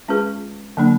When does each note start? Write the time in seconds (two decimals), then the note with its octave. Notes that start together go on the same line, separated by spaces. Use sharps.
0.08 G#3 C#4 F4 G#4 B4
0.77 D3 F#3 A#3 D4